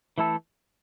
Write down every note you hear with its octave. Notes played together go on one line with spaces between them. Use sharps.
E3 A3 E4 A4